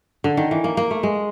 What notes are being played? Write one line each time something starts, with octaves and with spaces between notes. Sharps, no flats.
D3
D#3
E3
A#3
A#3
A3
G#3